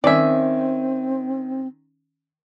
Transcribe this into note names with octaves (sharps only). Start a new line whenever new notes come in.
D#3 C4 C#4 D5 E5 G#5